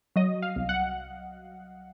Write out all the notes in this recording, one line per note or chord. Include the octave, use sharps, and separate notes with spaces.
F#3 D#5
F5
C2
F#5